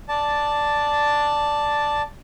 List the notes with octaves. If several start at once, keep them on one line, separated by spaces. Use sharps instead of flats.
D5 A5